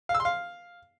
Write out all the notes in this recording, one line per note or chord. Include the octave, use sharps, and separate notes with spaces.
F5
E6
C6
F5